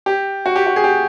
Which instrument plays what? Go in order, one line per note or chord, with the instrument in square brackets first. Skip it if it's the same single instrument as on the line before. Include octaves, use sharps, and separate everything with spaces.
[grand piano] G4
F#4
G4
F#4
G#4
G4